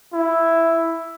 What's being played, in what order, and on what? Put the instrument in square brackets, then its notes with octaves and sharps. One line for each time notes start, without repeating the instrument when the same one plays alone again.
[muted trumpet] E4